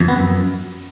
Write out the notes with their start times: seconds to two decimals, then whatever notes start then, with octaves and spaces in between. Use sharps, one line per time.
0.01 F2
0.08 B3
0.16 F#2